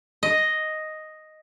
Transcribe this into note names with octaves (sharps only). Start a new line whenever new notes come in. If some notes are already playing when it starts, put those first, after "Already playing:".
D#5